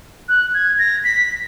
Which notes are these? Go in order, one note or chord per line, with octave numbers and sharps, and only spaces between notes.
F#6
G#6
A#6
B6